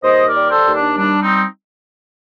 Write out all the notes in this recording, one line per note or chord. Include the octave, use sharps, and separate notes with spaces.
D#2 C5 D#5
A#4 D5
G3
A4 C5
D#2
D4
G3 D4
C4 D#4